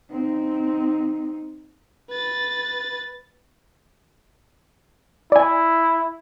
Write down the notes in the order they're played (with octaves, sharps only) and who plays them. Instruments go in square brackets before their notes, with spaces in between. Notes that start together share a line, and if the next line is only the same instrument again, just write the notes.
[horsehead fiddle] C4 D#4
[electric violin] B4 A6
[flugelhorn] E4 [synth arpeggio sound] D5 G#5